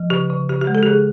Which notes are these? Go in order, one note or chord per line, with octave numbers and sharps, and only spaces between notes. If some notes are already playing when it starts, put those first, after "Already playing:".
Already playing: F3
C#3 G4
C#3
C#3 G4
G4
G#3
A4
G4
C#3 G#4